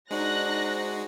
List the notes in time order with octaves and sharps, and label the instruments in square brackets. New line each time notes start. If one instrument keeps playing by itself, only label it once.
[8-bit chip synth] G#3 F#4 [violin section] D4 D#4 [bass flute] C5 [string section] F#6 A#6